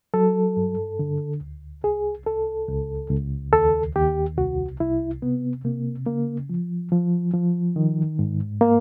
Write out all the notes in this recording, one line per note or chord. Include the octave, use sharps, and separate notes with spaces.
F#3 A4
G2
D3
D2
C2 G#4
C2 A4
C#2
C#2
D#2 A4
D#2 G4
C2 F#4
C2 E4
C3 B3
C3 A#3
C#3 A#3
F3
F3
F3
D#3
G#2
A#3